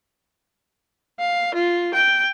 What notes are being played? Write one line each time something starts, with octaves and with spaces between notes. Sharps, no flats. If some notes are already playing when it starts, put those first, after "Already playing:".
F5
F4
G5